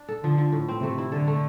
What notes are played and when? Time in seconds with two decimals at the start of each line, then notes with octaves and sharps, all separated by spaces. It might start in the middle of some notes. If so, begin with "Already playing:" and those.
Already playing: D4
0.09 A4
0.24 D3 F3
0.38 F3
0.52 A2
0.68 C4
0.83 C3 A3
0.98 E4
1.12 D3 A4
1.28 A3